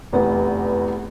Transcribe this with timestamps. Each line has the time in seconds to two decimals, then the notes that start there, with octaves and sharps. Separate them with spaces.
0.13 F1 E2 B3